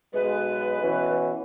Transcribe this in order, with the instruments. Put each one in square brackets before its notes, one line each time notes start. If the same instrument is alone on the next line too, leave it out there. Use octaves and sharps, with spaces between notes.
[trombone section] B1 G#3 [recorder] B4
[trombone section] B2 E3 C#4